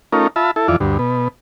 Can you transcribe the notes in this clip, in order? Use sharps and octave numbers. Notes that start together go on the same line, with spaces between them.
A3 C#4 D#4 F4 A#4
F4 E5 A5 B5
E4 A4
F2 E3 F4 D5
D2 G2
B2